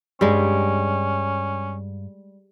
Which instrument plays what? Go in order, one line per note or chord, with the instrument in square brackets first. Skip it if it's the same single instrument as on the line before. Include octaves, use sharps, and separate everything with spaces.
[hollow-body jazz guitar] C#2 G2 [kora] G3 G#3 [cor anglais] C#4